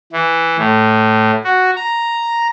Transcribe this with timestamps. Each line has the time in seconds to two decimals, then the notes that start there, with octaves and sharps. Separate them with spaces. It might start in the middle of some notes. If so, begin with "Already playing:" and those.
0.13 E3
0.58 A2
1.44 F#4
1.76 A#5